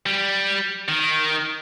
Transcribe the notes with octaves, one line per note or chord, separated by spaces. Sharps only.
G3
D#3